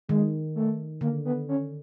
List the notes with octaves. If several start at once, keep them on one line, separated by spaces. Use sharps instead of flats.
D#3 G#3
A3
D3 A#3
B3
C#4